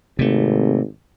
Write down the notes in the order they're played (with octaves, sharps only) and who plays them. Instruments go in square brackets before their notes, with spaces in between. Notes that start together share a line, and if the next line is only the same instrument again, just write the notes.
[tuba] G#1 [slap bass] C3 A3